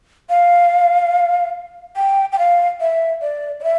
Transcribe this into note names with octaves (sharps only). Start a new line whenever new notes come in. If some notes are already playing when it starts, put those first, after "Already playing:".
F5
G5
G5
F5
E5
D5
D5
E5